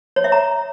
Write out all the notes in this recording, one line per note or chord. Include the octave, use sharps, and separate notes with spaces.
C#5
E5
A#5